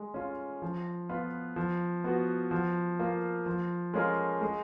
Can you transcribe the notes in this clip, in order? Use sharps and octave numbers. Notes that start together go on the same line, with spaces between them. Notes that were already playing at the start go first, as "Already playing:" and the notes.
Already playing: G#3
C#4 F4
F3
B3 F4 B4
F3
B3 F#4
F3
A#3 F4
F3
G#3 C#4 F4 A#4
G#3